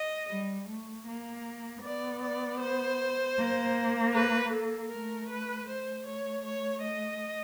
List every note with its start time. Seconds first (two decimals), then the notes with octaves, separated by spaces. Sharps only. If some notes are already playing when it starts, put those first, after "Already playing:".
Already playing: D#5
0.29 G3
0.67 A3
1.06 A#3
1.82 B3 D5
2.22 D5
2.60 C5
3.37 A#3
4.14 B4
4.52 A4
4.90 A3 A#4
5.29 B4
5.68 A3 C5
6.06 C#5
6.45 C#5
6.83 D#5